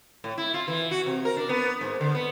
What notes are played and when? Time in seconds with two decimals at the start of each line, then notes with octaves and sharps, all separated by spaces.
0.24 A2
0.38 E4
0.54 F4
0.68 E3
0.91 F#4
1.06 C3
1.25 A#4
1.37 D4
1.49 B3
1.81 G#2
2.01 D3
2.15 B3